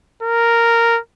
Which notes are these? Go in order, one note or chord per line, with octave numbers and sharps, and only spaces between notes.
A#4